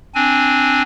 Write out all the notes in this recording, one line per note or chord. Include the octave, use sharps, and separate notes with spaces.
C4 D4 G#5